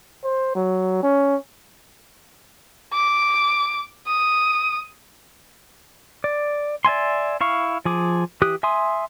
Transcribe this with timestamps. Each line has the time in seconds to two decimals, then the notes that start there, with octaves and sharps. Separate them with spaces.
0.24 C5
0.55 F#3
1.03 C#4
2.93 D6
4.07 D#6
6.24 D5
6.85 D5 E5 G#5 C6
7.41 E4 F5 C#6
7.85 F3 G#4 D6
8.42 E3 G4 D#6 F#6
8.63 E5 G#5 C6 D#6